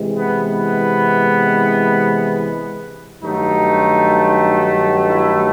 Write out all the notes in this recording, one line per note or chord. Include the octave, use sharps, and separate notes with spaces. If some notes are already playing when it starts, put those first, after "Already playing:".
Already playing: C3 E3 G#3
B3
B3
G2 D#3 F#3 A3 D#4
E4